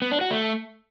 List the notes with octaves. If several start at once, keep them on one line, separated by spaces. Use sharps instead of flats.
B3
D4
F#4
A3